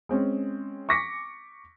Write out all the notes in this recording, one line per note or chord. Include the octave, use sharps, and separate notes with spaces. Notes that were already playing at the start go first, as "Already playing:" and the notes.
G#3 C4 C#4
C#6 D6 A#6 B6 C#7